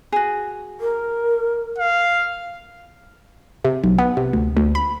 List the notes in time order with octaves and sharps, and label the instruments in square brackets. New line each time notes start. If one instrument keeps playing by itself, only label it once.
[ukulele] F#4 G#4
[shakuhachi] A#4
[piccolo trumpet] F5
[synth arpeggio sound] C3
B1
B3
C3
D2
D2
B5